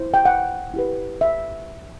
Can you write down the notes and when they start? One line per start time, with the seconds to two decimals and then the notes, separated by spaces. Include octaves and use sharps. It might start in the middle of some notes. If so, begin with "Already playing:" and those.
Already playing: E4 C5
0.14 G5
0.25 F#5
0.74 E4 G4 B4
1.21 E5